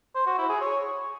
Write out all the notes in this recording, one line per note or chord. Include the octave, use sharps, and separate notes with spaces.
C5
F#4
E4
G#4
C#5